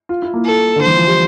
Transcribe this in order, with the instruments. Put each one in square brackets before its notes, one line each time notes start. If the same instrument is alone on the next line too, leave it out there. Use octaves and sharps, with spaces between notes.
[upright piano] F4
E4
A#3
[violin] A4
[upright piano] D3
[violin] C5
[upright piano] E3
F3
G3